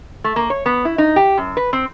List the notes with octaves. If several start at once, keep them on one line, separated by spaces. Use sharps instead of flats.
A3
A#3
C#5
B3
E4
D#4
G4
F#2
B4
C4